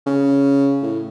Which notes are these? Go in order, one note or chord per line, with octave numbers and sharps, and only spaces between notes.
C#3
A2